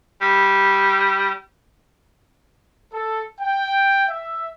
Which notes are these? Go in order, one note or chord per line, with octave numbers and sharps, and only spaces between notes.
G3
A4
G5
E5